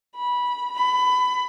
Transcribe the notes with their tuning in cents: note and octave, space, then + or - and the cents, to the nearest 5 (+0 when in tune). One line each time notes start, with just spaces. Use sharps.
B5 -15
B5 +20